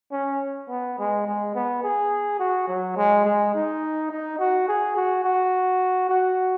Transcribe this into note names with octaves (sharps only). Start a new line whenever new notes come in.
C#4
B3
G#3
G#3
B3
G#4
F#4
F#3
G#3
G#3
D#4
D#4
F#4
G#4
F#4
F#4
F#4